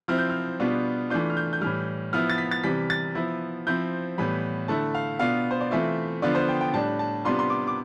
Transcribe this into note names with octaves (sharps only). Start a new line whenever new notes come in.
F3 C4 E4 F6
G6
F6
B2 G3 B3 D4 F4
E3 A3 D4 F4 G6
F6
G6
G6
A2 E3 G3 F6
F3 B3 E4 F6
A6
B6
A6
C3 E3 G3 B6
A6
F3 B3 E4
F3 C4 E4 G6
A2 E3 G3 B3 B5
D3 A3 E4 A5
F5
B2 B3 D4 F4 F5
C5
D5
E3 A3 C4 F4 E5
D3 F3 B3 D4 F4 D5
C5
G5
G5
A2 G3 D4 A5
A5
C3 G3 B3 D4 F4 C6
C6
D6
D6